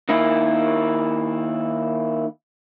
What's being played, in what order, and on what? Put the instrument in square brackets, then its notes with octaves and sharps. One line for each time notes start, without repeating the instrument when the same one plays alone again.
[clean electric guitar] D#3 A#3 E4